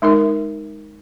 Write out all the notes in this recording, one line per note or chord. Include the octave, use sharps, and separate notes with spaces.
G#3 D#4 A#4 E5